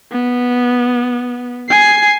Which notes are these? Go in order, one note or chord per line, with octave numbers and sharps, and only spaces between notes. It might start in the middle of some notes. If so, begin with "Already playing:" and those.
B3
G#5 C7